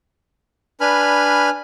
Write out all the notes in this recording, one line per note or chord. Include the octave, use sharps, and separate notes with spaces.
D4 B4 G#5 B5 F6